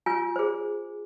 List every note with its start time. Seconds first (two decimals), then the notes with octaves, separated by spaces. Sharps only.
0.06 F4 G#5
0.36 G#4 C5